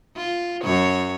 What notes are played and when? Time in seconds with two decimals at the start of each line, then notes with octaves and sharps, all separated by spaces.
0.16 F4
0.63 F#2 C#5